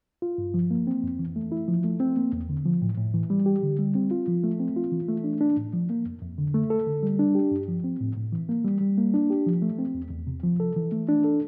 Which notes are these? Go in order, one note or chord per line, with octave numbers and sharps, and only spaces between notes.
F4
G2
F3
A#3
C4
F2
E3
A3
E4
F3
A3
C4
A#3
E2
D3
F3
A2
A2
E3
G3
G4
D3
G3
C4
F4
F3
A3
C4
F4
E3
A3
D4
D4
A2
F3
A#3
F2
F2
D3
A3
A4
D3
G3
D4
G4
G2
F3
C4
A2
A2
E3
A#3
G3
G3
A#3
D4
G4
F3
A3
C4
E2
E2
C3
F3
A4
E3
A3
D4
A4